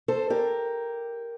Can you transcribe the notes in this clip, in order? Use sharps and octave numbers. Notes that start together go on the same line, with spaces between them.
A4 C5
G4 A#4